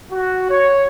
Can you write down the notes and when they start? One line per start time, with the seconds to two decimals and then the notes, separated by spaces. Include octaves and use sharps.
0.11 F#4
0.50 C#5